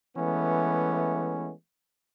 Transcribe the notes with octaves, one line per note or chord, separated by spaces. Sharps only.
E3 G#3 A3 B3 C#4